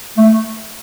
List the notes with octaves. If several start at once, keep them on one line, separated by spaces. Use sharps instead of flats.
A3